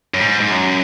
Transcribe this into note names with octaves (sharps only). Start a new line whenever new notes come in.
F#2
G#2
G#2
F#2